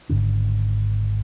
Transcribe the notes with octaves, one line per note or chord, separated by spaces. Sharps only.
G#1 G#2 D3 C#4